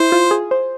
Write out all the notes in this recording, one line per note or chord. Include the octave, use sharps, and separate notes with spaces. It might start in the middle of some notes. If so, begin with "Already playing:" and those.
Already playing: E4 C5
F4
G#4
C5